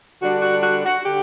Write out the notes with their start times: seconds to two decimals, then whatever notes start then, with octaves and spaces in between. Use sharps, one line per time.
0.22 D3 G3 D4 F#4
0.42 F#4
0.63 F#4
0.85 F#4
1.05 D3 G4